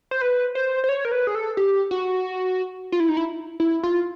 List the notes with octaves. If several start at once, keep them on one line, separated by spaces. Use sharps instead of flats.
C5
B4
C5
C5
C#5
A#4
B4
G#4
A4
G4
F#4
F4
E4
D#4
E4
E4
F4